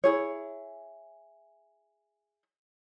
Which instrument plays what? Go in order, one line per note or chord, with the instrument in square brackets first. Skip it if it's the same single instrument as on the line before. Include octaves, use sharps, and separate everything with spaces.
[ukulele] E4 G#4 C#5